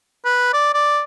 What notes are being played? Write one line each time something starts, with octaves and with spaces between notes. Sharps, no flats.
B4
D5
D5